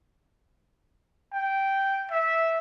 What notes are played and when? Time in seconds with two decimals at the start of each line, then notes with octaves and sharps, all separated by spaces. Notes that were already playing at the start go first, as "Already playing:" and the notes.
1.33 G5
2.11 E5